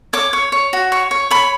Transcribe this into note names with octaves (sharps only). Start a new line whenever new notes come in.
C#5 D6
C#5
C#5
F#4
C#5
C#5
C#5 B5